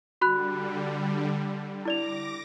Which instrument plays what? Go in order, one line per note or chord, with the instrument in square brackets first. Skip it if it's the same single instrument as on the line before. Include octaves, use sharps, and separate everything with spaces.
[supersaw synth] D3 G3 [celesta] F#4 B5 F#6
[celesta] E4 D5 F7 [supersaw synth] D6 A#6